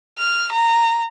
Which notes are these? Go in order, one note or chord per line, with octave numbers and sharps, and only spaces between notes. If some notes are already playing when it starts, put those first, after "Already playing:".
F6
A#5